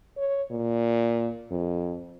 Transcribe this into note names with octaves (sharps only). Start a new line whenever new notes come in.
C#5
A#2
F2